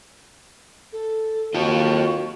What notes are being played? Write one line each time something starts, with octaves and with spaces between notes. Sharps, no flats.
A4
D#2 F4 F#4 A4